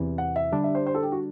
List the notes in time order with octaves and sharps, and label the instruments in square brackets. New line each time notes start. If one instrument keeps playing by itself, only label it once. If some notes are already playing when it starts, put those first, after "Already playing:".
Already playing: [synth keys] E2 C3 E3
[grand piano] F#5
E5
[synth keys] D3 G3 D4
[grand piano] E5
C5
C5
A4
G4
F#4